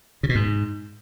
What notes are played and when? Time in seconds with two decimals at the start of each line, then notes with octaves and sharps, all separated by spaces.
0.23 C#3
0.29 B2
0.35 G#2